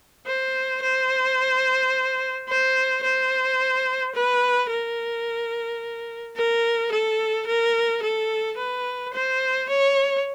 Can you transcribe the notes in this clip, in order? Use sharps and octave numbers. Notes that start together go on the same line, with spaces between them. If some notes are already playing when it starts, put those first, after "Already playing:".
C5
C5
C5
C5
B4
A#4
A#4
A4
A#4
A4
B4
C5
C#5